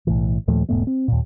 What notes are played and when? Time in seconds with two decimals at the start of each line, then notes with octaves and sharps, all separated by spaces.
0.07 B1 A2 E3
0.48 D#2 A#2 F3 A3
0.69 E1 G#2 A3 B3
0.87 C4
1.08 D#2 A#2